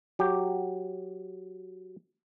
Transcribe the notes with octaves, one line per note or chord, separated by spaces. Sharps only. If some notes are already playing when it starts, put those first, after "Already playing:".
F#3 G4